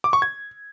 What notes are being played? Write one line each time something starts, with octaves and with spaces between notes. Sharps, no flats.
D6
C#6
G#6